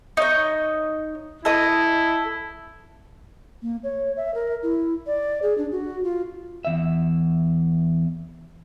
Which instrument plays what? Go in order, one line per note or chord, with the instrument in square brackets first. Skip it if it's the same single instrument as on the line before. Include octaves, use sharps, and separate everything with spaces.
[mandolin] D#4 C#5 D#5
[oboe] E4 [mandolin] A4 D#5 D#6
[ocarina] A#3
C#5
E5
A#4
E4
D5
G#4
D4
F#4
F4
[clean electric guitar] E2 E5